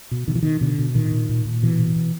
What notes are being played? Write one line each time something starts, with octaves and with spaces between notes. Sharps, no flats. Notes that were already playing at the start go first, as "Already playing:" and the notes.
B2
B2 D#3
E3
B2 D#3
B2 D3
B2
A#2 D#3
A#2
A#2
A#2
B2 E3
B2
B2